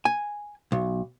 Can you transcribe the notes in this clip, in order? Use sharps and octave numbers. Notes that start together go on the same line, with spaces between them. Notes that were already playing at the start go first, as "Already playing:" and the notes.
G#5
B1